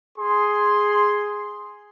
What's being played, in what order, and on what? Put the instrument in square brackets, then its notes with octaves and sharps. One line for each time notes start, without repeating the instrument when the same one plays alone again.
[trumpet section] G#4 C6